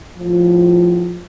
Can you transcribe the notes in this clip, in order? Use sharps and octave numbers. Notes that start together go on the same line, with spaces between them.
E2 A2 F3